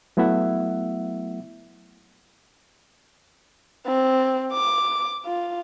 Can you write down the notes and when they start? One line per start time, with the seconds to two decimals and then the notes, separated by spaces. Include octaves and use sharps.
0.17 F#3 A3 B3 E4 E5 F#5
3.87 C4
4.53 D6
5.26 F4